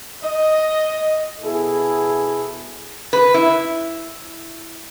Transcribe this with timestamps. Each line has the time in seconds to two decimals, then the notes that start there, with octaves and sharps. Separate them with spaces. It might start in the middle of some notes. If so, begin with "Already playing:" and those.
0.24 D#5
1.41 B2 E4 G#4 A4
3.13 B4
3.34 E4